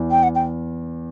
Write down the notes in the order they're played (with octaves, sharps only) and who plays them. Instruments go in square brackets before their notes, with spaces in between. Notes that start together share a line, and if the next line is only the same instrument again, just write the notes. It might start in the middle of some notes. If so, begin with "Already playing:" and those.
Already playing: [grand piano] E2
[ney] G5
F#5
G5